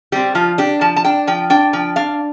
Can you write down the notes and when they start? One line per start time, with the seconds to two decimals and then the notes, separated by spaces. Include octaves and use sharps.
0.12 G3 C4 G4
0.35 F3 F4
0.58 D4 G4
0.81 F3 A5
0.96 A5
1.04 D4 G5
1.27 F3 G5
1.50 D4 G5
1.73 F3 G5
1.96 D4 F5